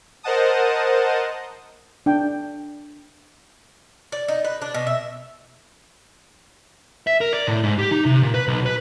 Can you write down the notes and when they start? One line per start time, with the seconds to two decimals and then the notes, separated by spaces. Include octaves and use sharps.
0.23 A#4 C5 D#5 F#5 A5 D#6
2.06 D4 G5
4.12 D5
4.28 D#4
4.45 B4
4.62 D4
4.74 B2
4.87 E5
7.07 E5
7.21 A#4
7.33 D5
7.47 A2
7.64 G#2
7.79 G4
7.92 D#4
8.05 C3
8.23 A#2
8.34 B4
8.48 B1
8.66 B4